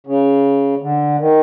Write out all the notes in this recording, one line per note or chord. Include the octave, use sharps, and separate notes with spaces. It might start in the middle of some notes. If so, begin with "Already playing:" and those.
C#3
D3
D#3